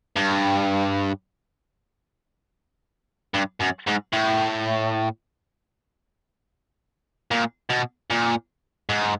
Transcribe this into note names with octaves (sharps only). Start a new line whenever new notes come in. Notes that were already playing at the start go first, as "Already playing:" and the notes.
G2
G2
F#2
G#2
A2
A#2
B2
A#2
G#2